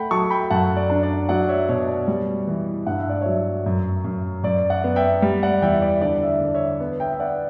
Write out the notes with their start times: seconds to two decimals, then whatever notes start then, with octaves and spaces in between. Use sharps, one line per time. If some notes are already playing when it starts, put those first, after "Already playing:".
Already playing: A3 F#5 G5 B5
0.11 F#3 A5 C#6
0.30 G5 B5
0.50 F#2 F#5 A5
0.77 D5
0.90 D4
1.03 D5
1.29 F#3 D5 F#5
1.49 C#5 E5
1.69 B2 C#5
1.88 D5
2.08 G3
2.47 E3
2.87 G2 F#5
2.98 E5
3.10 D5
3.21 F#3 C#5 E5
3.66 F#2
4.04 F#2
4.44 F#2 D5
4.70 D5 F#5
4.84 B3
4.96 E5 G5
5.22 G3
5.43 D5 F#5
5.62 E2 E5 G5
5.82 D5
6.01 D3 D5
6.22 E5
6.28 D5
6.41 D3
6.54 C#5 E5
6.80 B3
7.00 E5 G5
7.12 E5
7.20 B3 D5 F#5